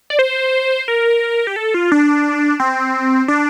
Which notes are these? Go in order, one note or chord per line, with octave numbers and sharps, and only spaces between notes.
D5
C5
A#4
G4
A4
F4
D4
C4
D4